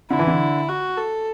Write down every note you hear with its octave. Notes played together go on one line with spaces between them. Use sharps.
D3 E4
E3
D3
F#4
A4